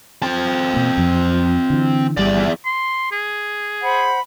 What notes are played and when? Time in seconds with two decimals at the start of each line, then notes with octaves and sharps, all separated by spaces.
0.22 C4 A5
0.74 B2 A#3
0.97 F2 F3
1.70 D3 E3
2.17 G1 E2 G3 D5
2.65 C6
3.12 G#4
3.82 C5 F#5 B5